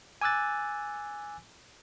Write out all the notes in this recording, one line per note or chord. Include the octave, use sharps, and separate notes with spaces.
G#5 D6 E6 F#6 A6